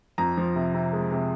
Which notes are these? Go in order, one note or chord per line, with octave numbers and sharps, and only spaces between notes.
F2 A#5
F3
C3
C3
G#3
C3